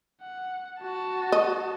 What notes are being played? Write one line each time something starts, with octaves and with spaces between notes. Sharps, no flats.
F#5
F#4 A5
D#5